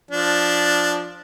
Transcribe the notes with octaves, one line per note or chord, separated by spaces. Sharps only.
F3 D4